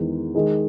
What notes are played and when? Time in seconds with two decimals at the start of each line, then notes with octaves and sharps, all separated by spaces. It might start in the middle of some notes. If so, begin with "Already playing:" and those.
Already playing: E2 D#3 G#3
0.35 D#3 G#3 D#4 G#4